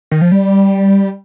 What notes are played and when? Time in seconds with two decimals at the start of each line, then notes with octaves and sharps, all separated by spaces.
0.11 D#3
0.21 F3
0.32 G3